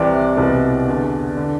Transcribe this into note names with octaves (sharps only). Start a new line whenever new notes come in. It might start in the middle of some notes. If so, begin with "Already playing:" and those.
Already playing: C2 C3 E3 D5
C2 B2
E2 D3
D3